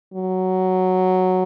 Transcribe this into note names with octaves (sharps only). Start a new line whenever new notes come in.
F#3